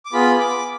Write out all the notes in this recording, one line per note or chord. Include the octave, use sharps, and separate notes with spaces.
D6
B3 F4 G#4 B5
D6